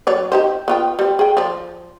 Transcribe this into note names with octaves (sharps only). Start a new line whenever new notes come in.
F#3 C#5 D5
D#4 G4 C5
B3 F4 G5
G3 C4
G#4 G5
F3 D5